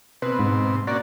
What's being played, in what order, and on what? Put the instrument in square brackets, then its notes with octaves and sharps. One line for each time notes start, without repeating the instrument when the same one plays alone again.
[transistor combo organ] B2 C4 [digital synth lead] B4
[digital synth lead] G#2
[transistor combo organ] A#3 C#4 F#4 [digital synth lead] D5